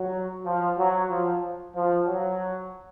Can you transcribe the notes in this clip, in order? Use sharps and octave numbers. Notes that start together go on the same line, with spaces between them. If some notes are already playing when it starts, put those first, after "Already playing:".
Already playing: F#3
F3
F#3
F3
F3
F#3